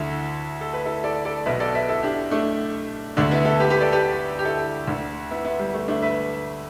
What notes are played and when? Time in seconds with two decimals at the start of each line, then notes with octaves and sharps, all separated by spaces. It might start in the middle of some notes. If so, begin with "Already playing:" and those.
Already playing: D2 D3 E4 A4
0.61 A4
0.73 B4
0.85 E4 A4
1.04 A4 D5
1.25 A4 D5
1.46 B1 B2 B4 E5
1.60 A4 D5
1.75 B4 E5
1.89 E4 A4
2.03 D4 G4
2.31 A3 D4
3.17 D2 D3 A3 D4
3.31 B3 E4
3.45 E4 A4
3.60 G4 B4
3.70 G4 B4
3.81 A4 D5
3.92 G4 B4
4.39 G4
4.45 E4 A4
4.88 D2 D3
5.31 B3 E4
5.45 B3 E4
5.59 G3
5.74 A3
5.88 A3 D4
6.02 B4 E5